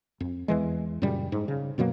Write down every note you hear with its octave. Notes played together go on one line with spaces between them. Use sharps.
F2
E2 E3 G#3
F#2 A#2 C#3 G3
G#2
C#3
F#2 B2 F#3 A#3